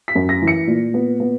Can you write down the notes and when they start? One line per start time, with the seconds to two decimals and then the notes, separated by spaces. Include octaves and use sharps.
0.08 B6
0.15 F#2
0.29 A#6
0.42 E3
0.48 C#7
0.67 A#2
0.94 B3
1.20 B3